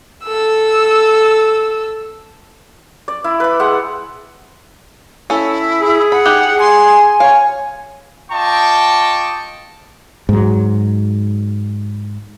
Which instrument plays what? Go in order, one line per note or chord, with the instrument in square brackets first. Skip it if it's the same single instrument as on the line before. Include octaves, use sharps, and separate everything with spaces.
[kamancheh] A4 E6
[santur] D5
E4
B4 B5
G#3 F#5 G5
[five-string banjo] C#4 A4 [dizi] E4
[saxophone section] G#4
[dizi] F#5 [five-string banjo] B5
[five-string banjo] D#4 G4 [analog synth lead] F#6
[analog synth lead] G#5 [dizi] C6
[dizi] C#5 [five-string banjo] F5
[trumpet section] F4 D#5 G5 A5 C#6 D6
[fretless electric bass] G#2 F#3